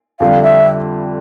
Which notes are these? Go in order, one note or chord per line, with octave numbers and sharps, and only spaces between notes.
F2 D3 G3 F5
E5